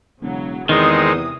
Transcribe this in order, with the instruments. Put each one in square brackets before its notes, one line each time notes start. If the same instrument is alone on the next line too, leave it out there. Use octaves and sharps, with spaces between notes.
[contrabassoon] E1 [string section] C#3 F#3
[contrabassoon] E2 [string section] C3 D#6 [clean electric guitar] D#3 [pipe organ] G#3 C4 D#4